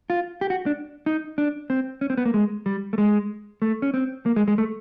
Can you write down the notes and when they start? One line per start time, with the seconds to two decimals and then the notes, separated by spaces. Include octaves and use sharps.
0.10 F4
0.41 G4
0.50 F#4
0.66 D4
1.06 D#4
1.38 D4
1.70 C4
2.01 C#4
2.10 C4
2.17 B3
2.26 A#3
2.34 G#3
2.66 G3
2.93 A3
2.98 G#3
3.62 A3
3.82 C#4
3.94 C4
4.26 A#3
4.36 G#3
4.48 G#3
4.58 A3